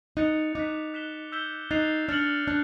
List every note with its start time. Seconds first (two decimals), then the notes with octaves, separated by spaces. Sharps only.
0.17 D#4 F#6 A6 C#7 F7
0.55 D#4 D6 F#6 B6
0.94 F#6 B6 E7 G7
1.32 E6 G6 B6 E7 G7
1.71 D#4 F#6 A6 C7 F7
2.09 D4 F6 A6 C#7 F#7
2.47 D4 F#6